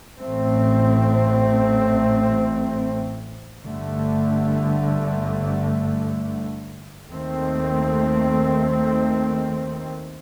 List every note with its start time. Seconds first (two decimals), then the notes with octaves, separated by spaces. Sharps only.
0.20 A1 A2 A3 C4
3.64 G1 G2 D3 A3
7.08 D#2 D#3 A3 C4